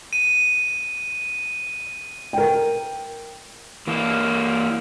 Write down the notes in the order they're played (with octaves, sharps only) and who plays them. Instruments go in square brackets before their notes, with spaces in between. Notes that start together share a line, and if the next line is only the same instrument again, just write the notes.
[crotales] D#7
[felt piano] A#4 G5
[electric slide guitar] E3 A#3